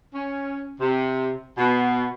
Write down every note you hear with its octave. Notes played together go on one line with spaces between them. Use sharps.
C#4
C3
B2